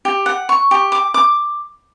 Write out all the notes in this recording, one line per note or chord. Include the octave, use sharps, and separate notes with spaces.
G4
F#5
C#6
G4
D6
D6